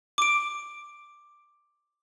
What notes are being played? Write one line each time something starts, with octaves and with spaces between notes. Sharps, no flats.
D6 D7